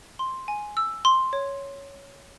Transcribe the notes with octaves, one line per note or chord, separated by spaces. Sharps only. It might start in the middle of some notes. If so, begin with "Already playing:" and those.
C6
G#5
E6
C6
C#5